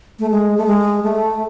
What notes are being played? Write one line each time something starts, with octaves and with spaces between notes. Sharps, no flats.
A3
G#3
A3
G#3
A3